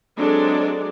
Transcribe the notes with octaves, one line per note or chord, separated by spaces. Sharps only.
F#3 G#3 C4 D4 A4 D5